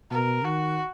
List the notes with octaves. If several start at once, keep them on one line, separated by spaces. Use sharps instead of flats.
B2 A#4
D#3 F#4